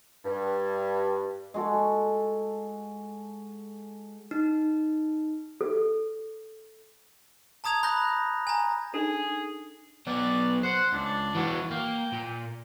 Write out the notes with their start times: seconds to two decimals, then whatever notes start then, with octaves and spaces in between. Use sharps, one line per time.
0.25 G2
1.54 G#3 F#4 A4
4.31 D#4
5.61 A4
7.64 A5 A#5 D#6 G#6 F7
7.83 B5 F#6 G6 A#6
8.47 G#5 A#5
8.94 D4 D#4 G#4 A4
10.07 F#3 B3 D5
10.63 C5 F#5
10.93 C#2 D4
11.35 E3 F#4
11.71 A#3 G5
12.12 A#2